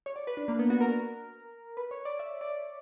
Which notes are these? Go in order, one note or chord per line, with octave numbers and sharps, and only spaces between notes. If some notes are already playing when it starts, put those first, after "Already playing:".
C#5
D5
B4
D4
A#3
B3
F#4
A#4
B4
C#5
D5
E5
D5